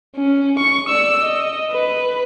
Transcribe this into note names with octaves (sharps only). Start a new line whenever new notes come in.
C#4
C#6
D5 E6
D#5
B4